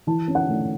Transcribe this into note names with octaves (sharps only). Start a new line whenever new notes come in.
E3 A5
C#4
F#5
A3